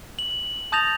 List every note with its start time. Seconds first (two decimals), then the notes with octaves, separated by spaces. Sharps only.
0.19 F#7
0.72 A5 D#6 G6 A6 A#6 F7